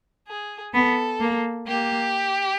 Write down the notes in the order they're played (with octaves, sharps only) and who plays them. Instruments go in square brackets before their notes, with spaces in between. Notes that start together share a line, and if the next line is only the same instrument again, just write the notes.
[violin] G#4
[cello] B3 [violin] A4
[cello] A#3
[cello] A#3 [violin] G4